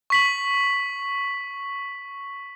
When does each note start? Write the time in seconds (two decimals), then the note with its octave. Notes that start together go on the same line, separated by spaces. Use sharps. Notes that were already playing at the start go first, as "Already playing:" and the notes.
0.10 C#6 B6 F#7